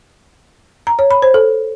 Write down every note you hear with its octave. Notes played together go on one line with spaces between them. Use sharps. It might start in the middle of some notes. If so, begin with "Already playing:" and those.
A#5
C#5
B5
C5
A4